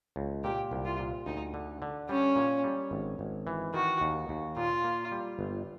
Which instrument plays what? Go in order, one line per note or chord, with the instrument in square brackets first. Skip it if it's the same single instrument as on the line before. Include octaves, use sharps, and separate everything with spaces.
[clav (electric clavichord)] C#2
[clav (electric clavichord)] A#2 [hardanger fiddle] G4
[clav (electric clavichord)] C2
[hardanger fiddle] F4
[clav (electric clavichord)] A#2
[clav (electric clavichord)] D2 [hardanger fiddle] D#4
[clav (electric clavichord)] D3
D3
[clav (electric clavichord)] G3 [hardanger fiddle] C#4
[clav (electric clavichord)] A#2
G3
G#1
G#1
E3
[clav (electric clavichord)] D#3 [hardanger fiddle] F#4
[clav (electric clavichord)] D#2
D#2
[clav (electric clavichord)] A#2 [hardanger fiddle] F4
[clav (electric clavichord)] A#3
G3
G1